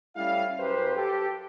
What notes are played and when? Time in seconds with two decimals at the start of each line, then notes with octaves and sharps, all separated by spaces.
0.16 G3 A3 C#4 E4 F5
0.59 F#2 G4 B4 C5
0.95 G4 A4